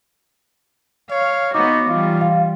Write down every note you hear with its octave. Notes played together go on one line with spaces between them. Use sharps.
C#5 F5
B3 D#4 F#4 D6
E3 G3 F4
F5